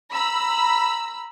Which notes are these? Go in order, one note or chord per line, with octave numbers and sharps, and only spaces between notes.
A#5 B5 E6